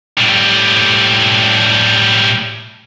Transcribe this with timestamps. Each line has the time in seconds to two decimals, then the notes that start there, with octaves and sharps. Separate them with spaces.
0.18 A2 G3